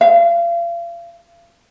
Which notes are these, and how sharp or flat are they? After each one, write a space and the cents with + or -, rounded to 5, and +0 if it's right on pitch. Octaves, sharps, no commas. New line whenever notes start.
F5 -35